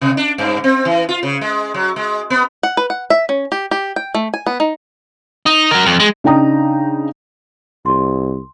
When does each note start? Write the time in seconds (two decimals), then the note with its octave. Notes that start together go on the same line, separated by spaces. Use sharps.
0.01 C3
0.17 D4
0.38 G2
0.64 C4
0.85 E3
1.09 F4
1.23 C#3
1.41 G#3
1.74 F#3
1.96 G#3
2.30 B3
2.63 F#5
2.77 B4
2.90 F#5
3.10 E5
3.29 C#4
3.52 G4
3.71 G4
3.96 G5
4.14 A3
4.34 G#5
4.46 B3
4.60 D#4
5.46 D#4
5.71 F#3 A#4
5.86 F2
6.00 G#3
6.24 C#3 D4 D#4 G5 A#5 D#6
7.86 C2 C6